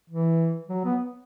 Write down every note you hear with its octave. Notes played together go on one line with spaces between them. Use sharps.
E3
F#3
B3